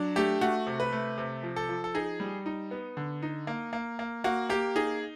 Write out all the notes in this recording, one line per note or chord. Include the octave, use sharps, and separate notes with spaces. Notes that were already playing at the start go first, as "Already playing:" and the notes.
Already playing: F#3 D4
A3 G4
A3 F#4
C3
B4
A3
C3
F3
A4
F3
A4
D#4 G#4
G3
D#4
B3
D3
D#4
A#3
A#3
A#3
A#3 F#4
A#3 G4
D#4 G#4